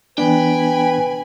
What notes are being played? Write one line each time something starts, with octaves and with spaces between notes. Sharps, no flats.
E3 B3 D4 B4 G5 G#5 B5